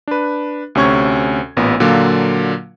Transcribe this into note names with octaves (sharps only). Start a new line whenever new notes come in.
D4 B4
D2 C3 C#4 C#6 G#6
A1 A#2 B3
A#2 D3 F#3 A#3 F4